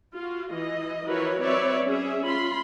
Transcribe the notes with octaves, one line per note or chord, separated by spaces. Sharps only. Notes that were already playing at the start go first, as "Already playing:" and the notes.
F4 F#4
E3 D#5
E3 F3 F#4 A#4 B4 C#5
F#3 C4 B4 C#5 D5 E5
C#4 G#4 E5
F4 B5 C6